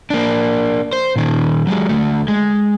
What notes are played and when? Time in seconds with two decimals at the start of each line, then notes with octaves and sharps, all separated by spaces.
0.10 A#3 D4
0.93 C5
1.16 A#2 D#3
1.67 F#3 G#3
1.89 D2 A3
2.28 G#3